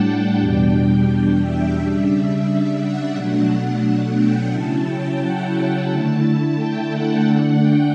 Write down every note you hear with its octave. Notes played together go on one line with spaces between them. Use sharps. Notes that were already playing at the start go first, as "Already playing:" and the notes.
Already playing: A2 G3 D4 F#5 G5 A5
E2 B2 G3 D4
E5
C#3 G3 D4
E5
F#5
B2 F#3 A3 D4
G5
C#3 F#3 C#4 E4 A5
G5
F#5
A5
D3 A3 E4
G5
F#5
D3 A3 D4
G5